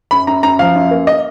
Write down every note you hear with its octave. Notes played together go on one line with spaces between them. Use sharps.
F#2 B5
F#2 A#5
F#2 A#5
F3 F5
F#2
A#3
D#5